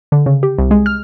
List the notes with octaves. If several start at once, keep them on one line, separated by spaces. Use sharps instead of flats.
D3
C#3
G4
C2
G#3
F6